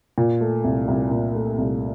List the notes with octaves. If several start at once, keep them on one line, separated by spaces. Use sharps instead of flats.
A#2
A3
C2
C2
A#2
A3
C2